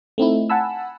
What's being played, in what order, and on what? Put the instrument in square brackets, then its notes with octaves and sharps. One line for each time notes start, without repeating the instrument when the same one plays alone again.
[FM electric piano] A3 C4 D#4 E4
F#5 G#5 A5 B5 E6